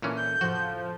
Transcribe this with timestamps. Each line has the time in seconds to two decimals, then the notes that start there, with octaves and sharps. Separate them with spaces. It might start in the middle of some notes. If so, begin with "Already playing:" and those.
0.02 A#2 E3 C#4 D4 A4 C6
0.16 G6
0.41 F2 A2 C#3 F3 F#4